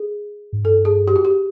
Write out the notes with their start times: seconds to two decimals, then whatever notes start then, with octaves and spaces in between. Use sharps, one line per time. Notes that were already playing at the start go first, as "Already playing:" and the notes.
Already playing: G#4
0.53 G#2
0.64 G2 A4
0.85 G#4
1.08 G4
1.16 F#4
1.25 G4